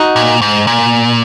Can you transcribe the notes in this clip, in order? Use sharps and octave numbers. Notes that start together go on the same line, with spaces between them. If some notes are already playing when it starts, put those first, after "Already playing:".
Already playing: D#4 F#4
A#2
G#2
A#2